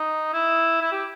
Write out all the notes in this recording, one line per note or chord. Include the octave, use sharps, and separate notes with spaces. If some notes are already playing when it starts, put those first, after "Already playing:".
Already playing: D#4
E4
E4
G4